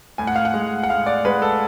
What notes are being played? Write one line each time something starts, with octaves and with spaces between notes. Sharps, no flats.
A2 G#5
F#5
F5
F#5
G#3
F#5
A2 F5
D5
G#3 B4
A4